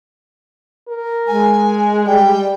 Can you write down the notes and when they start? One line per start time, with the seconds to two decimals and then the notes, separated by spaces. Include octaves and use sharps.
0.89 A#4
1.27 G#3 G#5
2.07 G3 G5